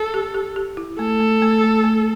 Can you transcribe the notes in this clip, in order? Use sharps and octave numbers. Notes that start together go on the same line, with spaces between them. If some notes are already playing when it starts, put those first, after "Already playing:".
Already playing: A4
G4
G4
G4
E4
A3 A4
A3
A3
A3
A3